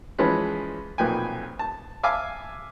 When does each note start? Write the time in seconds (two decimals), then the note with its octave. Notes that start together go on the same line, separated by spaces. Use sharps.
0.18 E3 F3 G#3 C#4 B4
0.98 B1 F2 A#2 B4 G5 G#5
1.59 A5
2.03 E5 F5 G#5 A5 D6